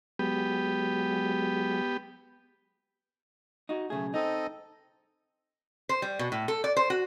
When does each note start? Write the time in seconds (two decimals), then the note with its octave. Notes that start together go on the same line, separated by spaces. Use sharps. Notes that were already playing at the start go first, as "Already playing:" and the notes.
0.19 F#3 G#3 B3 G4
3.69 D#4 F#4
3.90 B1 C#3 A3 G#4
4.14 C4 D#4 A4 D#5
5.89 C5
6.02 G3
6.19 B2
6.32 A2
6.48 A4
6.64 D5
6.77 C5
6.90 F#4